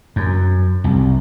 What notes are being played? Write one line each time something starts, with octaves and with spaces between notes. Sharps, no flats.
F#2
C2